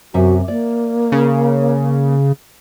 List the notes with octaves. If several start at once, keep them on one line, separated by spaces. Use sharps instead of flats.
F#2 C3 F#4 E5
A#3 D5
C#3